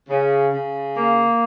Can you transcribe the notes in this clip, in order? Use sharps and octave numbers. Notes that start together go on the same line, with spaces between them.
C#3
C#3
A#3